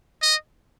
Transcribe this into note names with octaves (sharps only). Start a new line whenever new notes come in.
D#5